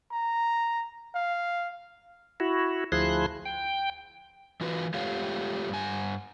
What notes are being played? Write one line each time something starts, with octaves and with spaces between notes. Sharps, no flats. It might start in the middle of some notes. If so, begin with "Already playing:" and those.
A#5
F5
E4 F#4
D2 F3 E4 G#4 C6 F#6
G5
E3 F4 F#4 B4
G#3 A3 F4 G4 C#5 F5
G2 G#5